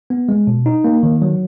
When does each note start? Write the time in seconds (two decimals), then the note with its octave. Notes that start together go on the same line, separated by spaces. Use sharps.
0.10 B3
0.29 G#3
0.47 B2
0.66 D#4
0.84 A#3
1.03 D#3
1.22 F#3